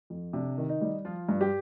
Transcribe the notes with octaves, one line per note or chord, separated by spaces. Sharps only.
F2
C3 D4
D#3
D#4
G3
F3 F4
G2
G4